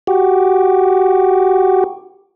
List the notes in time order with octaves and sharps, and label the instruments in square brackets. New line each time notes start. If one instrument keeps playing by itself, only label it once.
[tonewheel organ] F#4 G4